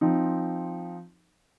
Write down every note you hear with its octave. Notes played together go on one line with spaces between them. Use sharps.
F3 C4 D#4